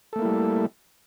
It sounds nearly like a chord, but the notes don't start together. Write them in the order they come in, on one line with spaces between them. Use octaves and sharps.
A4 A3 A#3 E4 G3